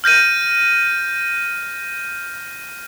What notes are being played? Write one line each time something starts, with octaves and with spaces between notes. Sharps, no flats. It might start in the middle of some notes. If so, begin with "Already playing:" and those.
F6 G6 A#6 D#7